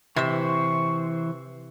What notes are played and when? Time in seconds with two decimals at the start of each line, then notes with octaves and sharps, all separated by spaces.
0.16 C3 E3 C5 E5 C#6